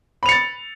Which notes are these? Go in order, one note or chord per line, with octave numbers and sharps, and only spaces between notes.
B5 A6 C#7 F7